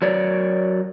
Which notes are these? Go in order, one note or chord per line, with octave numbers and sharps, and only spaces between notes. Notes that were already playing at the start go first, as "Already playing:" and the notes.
F#3 A#4 C#5 D5